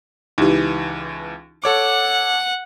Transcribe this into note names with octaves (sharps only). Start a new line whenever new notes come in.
C#2 E3 D#4 E4 G4
A4 C#5 F#5 D6